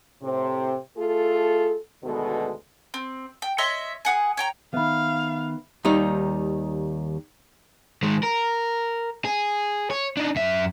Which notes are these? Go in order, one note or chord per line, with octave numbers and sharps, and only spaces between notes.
A2 C3 C4
A3 F4 G#4 A4
D2 B2 D#3 G#3 B3 A4
C4
G5
C#5 D#5 E5 C6
G#4 F#5 G#5
C#5 G5 A#5
D#3 B3 E5 F5 B5
D#2 D#3 G3 D#4
D#3 G#3
A#4
G#4
C#5
D4 D#4
F#2 E5